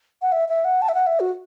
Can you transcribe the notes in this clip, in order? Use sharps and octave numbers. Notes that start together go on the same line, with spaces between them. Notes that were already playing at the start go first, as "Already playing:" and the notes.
F#5
E5
E5
F#5
A5
E5
F#5
E5
F#4